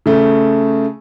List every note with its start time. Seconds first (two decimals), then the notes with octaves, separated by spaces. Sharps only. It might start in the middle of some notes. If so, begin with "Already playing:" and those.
0.06 C#3 A3